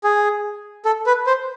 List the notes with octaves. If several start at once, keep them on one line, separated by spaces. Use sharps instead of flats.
G#4
A4
B4
C5